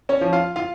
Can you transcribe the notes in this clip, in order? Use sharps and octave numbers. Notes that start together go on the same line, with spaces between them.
C#4 C#5
F3
F4 F5
F4 F5